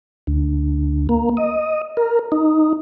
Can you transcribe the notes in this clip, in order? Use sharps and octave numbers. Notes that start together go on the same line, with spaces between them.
D2
A#3
D#5
A#4
D#4